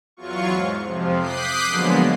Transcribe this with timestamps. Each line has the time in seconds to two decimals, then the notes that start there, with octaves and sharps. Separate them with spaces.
0.17 E2 F#3 F4 C#6
0.50 G#2
0.83 F2 C3 F3
1.17 D6 D#6 F#6 G6 B6 C7
1.68 D3 F3 F#3 G#3 A#3 B3